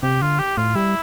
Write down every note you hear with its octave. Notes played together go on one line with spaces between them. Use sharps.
C3 G4
D3 F4
G4
A2 F4
G3 E4